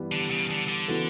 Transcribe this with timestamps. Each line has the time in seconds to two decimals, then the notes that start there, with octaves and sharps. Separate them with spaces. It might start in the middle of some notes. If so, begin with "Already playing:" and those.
Already playing: G2 E3 G3 B3
0.12 D3
0.31 C#3
0.50 D3
0.69 D3
0.88 C#3 E3 B3 F#4 A4